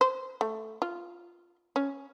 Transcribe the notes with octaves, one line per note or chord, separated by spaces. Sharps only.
C5
A3
F4
C#4